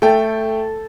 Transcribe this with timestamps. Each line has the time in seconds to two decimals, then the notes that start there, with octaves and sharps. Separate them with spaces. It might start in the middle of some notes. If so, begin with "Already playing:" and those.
0.02 A3 A4 G5